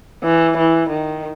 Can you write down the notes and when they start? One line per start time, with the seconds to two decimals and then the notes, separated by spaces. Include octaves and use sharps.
0.24 E3
0.57 E3
0.90 D#3